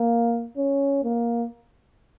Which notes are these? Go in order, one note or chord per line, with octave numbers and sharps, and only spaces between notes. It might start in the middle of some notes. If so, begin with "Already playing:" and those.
Already playing: A#3
C#4
A#3